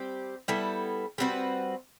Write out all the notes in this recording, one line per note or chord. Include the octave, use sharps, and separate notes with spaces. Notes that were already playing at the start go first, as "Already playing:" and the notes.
Already playing: G3 C4 G4
G3 B3 E4 A4
G3 C4 F#4 B4